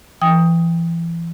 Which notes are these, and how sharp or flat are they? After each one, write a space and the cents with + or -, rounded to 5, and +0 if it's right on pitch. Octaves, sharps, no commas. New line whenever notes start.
E3 +30 G5 +25 D#6 +5